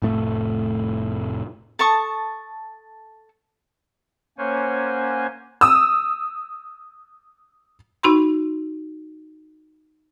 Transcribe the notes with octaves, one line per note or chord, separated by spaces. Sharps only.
F1 A2 A3
A4 A5 C#6 D#6
A#3 C#4 C5 C#5 F#5 G#5
D#6 E6
D#4 F#4 B5 C6